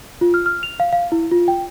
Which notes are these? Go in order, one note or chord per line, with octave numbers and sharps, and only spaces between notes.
F4
F6
F6
F7
F5
F5
E4
F4
G5